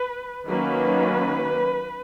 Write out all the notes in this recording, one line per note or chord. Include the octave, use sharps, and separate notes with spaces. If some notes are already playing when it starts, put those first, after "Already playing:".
Already playing: B4
D#3 F#3 A#3 C#4 B4